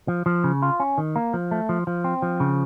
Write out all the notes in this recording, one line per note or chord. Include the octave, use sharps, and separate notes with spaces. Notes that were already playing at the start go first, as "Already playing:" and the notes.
F3
F3
C#3
F4
C#4
D#3
A#3
F3
A3
F3
F3
C4
F3
C#3